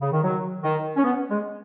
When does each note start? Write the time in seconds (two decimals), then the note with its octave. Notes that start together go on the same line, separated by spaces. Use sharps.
0.01 C#3
0.12 D#3
0.23 F#3
0.63 D#3
0.97 C#4
1.04 B3
1.31 G#3